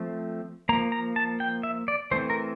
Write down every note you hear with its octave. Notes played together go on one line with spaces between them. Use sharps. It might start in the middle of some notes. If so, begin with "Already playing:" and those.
Already playing: F3 A3 C4
F3 A#3 A#5
A#5
A5
G5
E5
D5
E3 A3 C4 C5
A#4